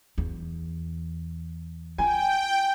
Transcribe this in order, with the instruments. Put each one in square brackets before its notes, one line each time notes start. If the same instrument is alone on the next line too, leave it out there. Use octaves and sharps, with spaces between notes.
[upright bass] E2
[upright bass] F4 [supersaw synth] G5 [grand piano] G#5